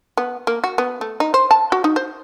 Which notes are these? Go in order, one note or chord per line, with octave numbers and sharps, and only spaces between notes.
B3
A#3
F#4
B3
A3
D#4
C5
A5
F#4
D#4
C5